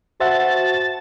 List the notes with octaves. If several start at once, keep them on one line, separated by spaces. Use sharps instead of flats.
F#4 C5 E5 F#5 A5